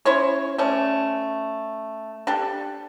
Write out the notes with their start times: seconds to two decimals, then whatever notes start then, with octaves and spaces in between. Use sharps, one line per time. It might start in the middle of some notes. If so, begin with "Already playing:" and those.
0.05 C#4 E4 C5 C#5
0.58 A3 C#4 D5
2.27 D4 G4 A4